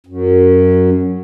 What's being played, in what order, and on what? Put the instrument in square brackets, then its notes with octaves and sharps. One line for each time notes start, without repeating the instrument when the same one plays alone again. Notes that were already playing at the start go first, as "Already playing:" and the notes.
[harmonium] F#2